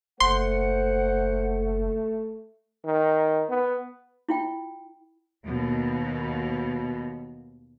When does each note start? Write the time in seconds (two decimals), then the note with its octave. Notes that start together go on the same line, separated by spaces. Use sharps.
0.20 F#1 A3 C5 F#5 C6
2.85 D#3
3.49 B3
4.29 E4 F4 G5
5.44 D#2 B2